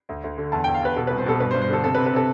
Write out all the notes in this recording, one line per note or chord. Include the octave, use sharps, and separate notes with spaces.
D2
D2
D3
E2 A5
E2 G5
F5
E2 B4
B2 A4
C2 B4
C5
B2 A4
G2 B4
C5
G2
C5
D3 A4
C3 A4
B4
C3
B4
C3 A4